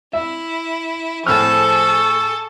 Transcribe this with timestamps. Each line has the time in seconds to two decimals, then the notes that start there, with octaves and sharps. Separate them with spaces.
0.13 E4 E5
1.27 A2 F3 G#4 A4 C#6 E6 F6